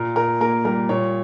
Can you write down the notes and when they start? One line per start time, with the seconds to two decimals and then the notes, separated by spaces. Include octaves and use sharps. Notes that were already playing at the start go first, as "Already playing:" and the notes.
Already playing: A#2 A#4
0.16 A#2 A#4
0.40 A#3 A#4
0.65 G3 A#4
0.89 A#2 C#5